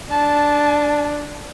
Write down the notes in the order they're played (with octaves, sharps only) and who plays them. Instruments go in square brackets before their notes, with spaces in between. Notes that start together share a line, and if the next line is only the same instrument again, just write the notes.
[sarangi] D4 [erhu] A5